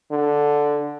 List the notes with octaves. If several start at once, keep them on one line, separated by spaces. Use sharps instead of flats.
D3